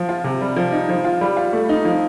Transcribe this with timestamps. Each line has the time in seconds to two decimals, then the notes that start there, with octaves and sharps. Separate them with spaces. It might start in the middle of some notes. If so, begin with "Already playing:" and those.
Already playing: F3
0.09 F4
0.24 C3
0.41 G3
0.56 F3
0.72 D#4
0.89 F3
1.04 F4
1.21 G3
1.37 F4
1.53 A3
1.69 D#4
1.85 F3